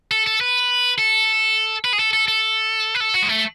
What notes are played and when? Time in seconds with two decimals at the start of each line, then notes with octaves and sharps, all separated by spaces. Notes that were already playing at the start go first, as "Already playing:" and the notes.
0.11 A4
0.26 A4
0.41 B4
0.98 A4
1.85 B4
1.93 G#4
1.99 A4
2.13 A4
2.28 A4
2.95 B4
3.00 A4
3.14 F#4
3.22 G#3
3.29 A3